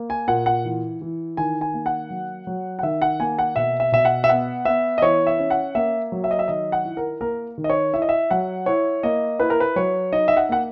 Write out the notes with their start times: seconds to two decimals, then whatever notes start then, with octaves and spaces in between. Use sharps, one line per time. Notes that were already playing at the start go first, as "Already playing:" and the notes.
Already playing: A#3
0.10 G#5
0.28 A#2 F#5
0.46 F#5
0.65 E3
1.01 E3
1.37 D#3 G#5
1.61 G#5
1.74 A#3
1.86 F#5
2.10 F#3
2.47 F#3
2.79 F#5
2.83 D#3 E5
3.02 F#5
3.20 A#3 G#5
3.39 F#5
3.56 B2 E5
3.80 E5
3.92 B2 E5
4.05 F#5
4.24 E5
4.29 B3 F#5
4.65 B3 E5
4.98 D#5
5.02 E3 C#5
5.27 E5
5.39 C#4
5.50 F#5
5.75 A#3 E5
6.12 F#3
6.24 E5
6.31 D#5
6.39 E5
6.48 D#3 D#5
6.72 F#5
6.85 E4
6.97 A#4
7.21 A#3 A#4
7.58 D#3
7.64 D#5
7.70 C#5
7.94 E4 E5
8.02 D#5
8.09 E5
8.31 F#3 F#5
8.66 E4 C#5
9.03 A#3 D#5
9.40 E4 B4
9.50 A#4
9.60 B4
9.76 F#3 C#5
10.12 D#4 D#5
10.28 E5
10.37 F#5
10.49 A#3 F#5